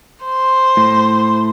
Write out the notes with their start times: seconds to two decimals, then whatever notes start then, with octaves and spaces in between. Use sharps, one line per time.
0.25 C5
0.77 A2